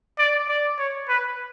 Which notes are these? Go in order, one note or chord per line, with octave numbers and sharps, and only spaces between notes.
D5
D5
C#5
B4